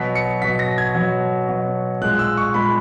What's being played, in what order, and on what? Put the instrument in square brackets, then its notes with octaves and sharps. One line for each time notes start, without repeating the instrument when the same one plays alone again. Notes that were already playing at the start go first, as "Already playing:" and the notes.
Already playing: [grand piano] B2 F#3 B6
C#7
B2 F#3 B6
A#6
G#6
B2 F#3
B2 F#3
A#2 G#3 F#6
E6
C#6
A#2 G#3 B5